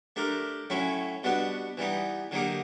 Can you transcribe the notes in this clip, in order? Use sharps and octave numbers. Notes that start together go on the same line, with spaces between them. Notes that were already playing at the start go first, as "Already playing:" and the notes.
A3 D4 G4 A#4
A2 F#3 A3 C#4 E4
B2 G3 B3 D4 F#4
E3 G3 B3 D#4
D3 F#3 A#3 D#4 G4